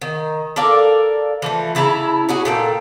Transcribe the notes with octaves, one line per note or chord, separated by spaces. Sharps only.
D#3
A4 A#4 D5 F5
E3 F3 A3
C#3 E4 A5 A#5
C#4 F#4 G#4
A#2 A4 G5